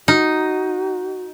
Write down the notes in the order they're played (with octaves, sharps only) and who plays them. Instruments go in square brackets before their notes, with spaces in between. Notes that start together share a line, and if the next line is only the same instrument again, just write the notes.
[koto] D#4 [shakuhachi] F#4